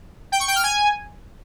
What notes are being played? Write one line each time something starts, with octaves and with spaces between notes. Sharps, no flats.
G5
C#6
G5
F6
G#5